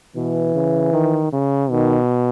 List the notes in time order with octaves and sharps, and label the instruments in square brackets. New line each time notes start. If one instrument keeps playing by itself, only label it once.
[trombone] B2 [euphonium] E3
[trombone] C#3
D#3
C#3
[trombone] B2 [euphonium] D#3